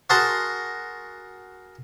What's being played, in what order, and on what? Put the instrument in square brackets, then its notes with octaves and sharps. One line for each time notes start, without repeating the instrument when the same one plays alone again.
[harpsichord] F#4 G#4 A#4 A5 A#5 C6